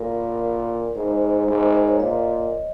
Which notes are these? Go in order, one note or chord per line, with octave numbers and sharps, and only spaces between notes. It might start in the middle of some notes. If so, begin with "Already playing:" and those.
Already playing: A#2 A#4
G#2 C5
G#2
A#4
C5
C#5
A#2 D#5